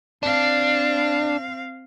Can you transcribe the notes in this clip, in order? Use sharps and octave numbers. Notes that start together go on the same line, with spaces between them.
C4 D4 F5